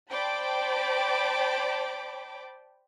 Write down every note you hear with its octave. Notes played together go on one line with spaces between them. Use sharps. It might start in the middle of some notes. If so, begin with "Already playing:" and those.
C5 D5 G5 A5 B5 D6